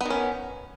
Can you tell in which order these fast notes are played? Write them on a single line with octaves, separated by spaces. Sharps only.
B3 D#3 C#4